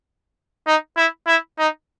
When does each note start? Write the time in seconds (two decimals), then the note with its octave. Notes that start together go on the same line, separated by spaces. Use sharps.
0.67 D#4
0.97 E4
1.27 E4
1.59 D#4